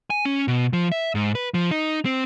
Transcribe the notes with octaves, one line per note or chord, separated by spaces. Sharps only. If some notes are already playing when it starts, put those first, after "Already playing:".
G#5
C#4
B2
F3
E5
G#2
B4
F3
D#4
C4